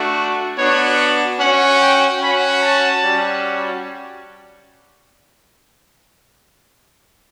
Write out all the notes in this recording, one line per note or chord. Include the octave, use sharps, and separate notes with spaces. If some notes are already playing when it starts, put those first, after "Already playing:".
Already playing: A3 D4 F#4
B3 D4 F#4 C#5
C#4 F#4 F#5
G5
C#4 F#4 B5
A5
G3 C#4 F#4